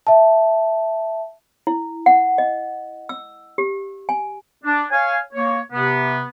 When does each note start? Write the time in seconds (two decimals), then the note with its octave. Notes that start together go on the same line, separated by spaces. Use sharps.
0.07 E5 A5
1.67 E4
2.06 F#5
2.38 D#5
3.09 E6
3.58 G4
4.09 G#5
4.64 D4
4.90 C#5 F5 G#5
5.33 A#3 C#5
5.72 C3 B3